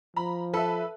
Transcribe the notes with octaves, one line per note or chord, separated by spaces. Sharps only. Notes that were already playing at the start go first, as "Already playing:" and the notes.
F3 A#5 B5
A4 B4 E5